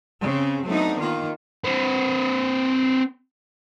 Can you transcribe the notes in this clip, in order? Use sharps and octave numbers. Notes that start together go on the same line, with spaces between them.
C#3 C4
F#3 A3 B3 C4 D4 D#4
D#3 A#3 F4
C4 B4